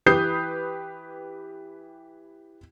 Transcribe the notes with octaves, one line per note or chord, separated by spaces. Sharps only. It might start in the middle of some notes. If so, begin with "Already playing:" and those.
E3 G4 B4 D#6 G6 C7